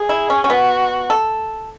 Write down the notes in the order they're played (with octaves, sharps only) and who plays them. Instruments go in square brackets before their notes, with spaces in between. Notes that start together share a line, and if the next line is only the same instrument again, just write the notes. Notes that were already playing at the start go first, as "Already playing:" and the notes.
Already playing: [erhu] G#4
[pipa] E4
C#4
C#4
[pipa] B3 [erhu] F#4
[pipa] A4